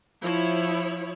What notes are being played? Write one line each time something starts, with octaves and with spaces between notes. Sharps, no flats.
F3 E4 C#5